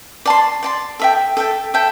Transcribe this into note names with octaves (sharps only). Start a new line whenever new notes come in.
D5 A5 C6
D5 A5 C6
A4 E5 G5
A4 E5 G5
A4 E5 G5